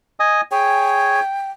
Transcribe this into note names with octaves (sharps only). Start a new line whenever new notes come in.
D#5 G#5 D#6
G#4 C#5 G5 G#5